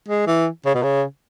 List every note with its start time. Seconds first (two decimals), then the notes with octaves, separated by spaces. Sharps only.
0.09 G#3
0.27 E3
0.66 C#3
0.75 B2
0.83 C#3